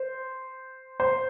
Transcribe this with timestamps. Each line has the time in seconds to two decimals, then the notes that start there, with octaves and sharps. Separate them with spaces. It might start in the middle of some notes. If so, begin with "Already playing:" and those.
Already playing: C5
1.00 C5